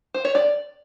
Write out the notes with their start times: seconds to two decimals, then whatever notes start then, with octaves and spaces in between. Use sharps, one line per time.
0.14 C5
0.25 C#5
0.35 D5